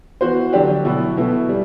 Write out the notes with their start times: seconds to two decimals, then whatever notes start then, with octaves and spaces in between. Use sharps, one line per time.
0.21 E3 B3 F#4 C5
0.53 D3 F#3 A3 D4 G4
0.85 B2 F#3 B3 E4
1.17 B2 A3 E4
1.49 G3